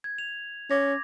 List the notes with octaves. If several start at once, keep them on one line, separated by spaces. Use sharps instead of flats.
G#6
F7
C#4 D6 G#6 A#6